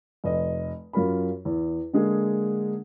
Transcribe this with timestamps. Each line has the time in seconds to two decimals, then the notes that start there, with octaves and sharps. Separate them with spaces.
0.24 F1 D#5
0.93 F#2 F4 A#4 B5
1.45 E2
1.93 D3 G#3 A#3 G#4